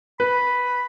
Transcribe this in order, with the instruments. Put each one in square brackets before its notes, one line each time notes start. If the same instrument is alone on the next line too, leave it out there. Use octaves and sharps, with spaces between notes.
[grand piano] B4 [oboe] B5